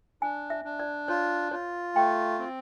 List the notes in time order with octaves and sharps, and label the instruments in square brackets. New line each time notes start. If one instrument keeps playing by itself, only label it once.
[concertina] D4 [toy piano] G#5
[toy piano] E5
[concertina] D4
[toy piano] D5
[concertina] F4 [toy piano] C#5
[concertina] F4 [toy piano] C#5
[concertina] A3 [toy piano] G5
[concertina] C4